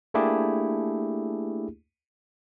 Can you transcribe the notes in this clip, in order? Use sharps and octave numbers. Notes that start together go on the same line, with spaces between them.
A3 A#3 D4 E4 G4 G#4